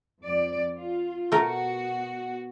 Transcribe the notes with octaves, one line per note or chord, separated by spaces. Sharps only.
F2 D5
F4
B2 A3 F#4 A#4